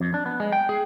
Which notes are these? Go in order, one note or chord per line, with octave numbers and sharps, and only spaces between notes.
F2
D4
B3
G#3
G5
G#4